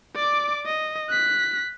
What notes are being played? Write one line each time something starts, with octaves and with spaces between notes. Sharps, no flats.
D5 D6
D#5
F#6 B6